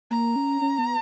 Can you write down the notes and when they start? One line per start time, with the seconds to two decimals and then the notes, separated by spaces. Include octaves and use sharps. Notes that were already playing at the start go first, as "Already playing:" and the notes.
0.11 A#3 A#5
0.36 C#4
0.61 C#4
0.78 B3